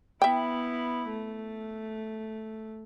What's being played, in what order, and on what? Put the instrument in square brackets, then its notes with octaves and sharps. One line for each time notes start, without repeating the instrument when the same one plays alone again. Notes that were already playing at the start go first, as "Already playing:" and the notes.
[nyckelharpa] B3 E4 [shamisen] E5 G5
[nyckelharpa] A3